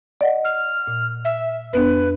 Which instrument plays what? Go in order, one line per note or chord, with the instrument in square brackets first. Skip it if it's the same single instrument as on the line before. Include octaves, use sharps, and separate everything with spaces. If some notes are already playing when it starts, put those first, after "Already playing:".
[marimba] D5 D#5 F#5
[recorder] F6
[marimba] A#2
[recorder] E5
[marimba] F2 B3 D4 [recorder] B4